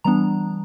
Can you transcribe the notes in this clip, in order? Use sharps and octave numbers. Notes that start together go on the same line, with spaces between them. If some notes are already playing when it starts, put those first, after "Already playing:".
E3 G3 B3 D4 A#5